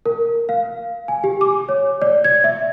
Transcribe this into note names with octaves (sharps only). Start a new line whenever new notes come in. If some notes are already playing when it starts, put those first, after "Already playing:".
A#4
F5
G#5
G4
D6
C#5
D5
G#6
E5